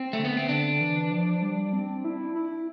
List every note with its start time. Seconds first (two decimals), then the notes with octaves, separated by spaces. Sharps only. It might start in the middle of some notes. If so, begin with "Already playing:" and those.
Already playing: C4
0.13 A3
0.18 D3
0.25 B3
0.37 C4
0.49 D3 D4
0.81 E3
1.11 F3
1.42 G3
1.73 C4
2.05 E4
2.35 E4